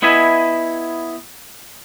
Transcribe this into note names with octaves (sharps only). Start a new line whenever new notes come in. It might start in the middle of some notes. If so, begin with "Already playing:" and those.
B3 E4 D#5 E5 G#5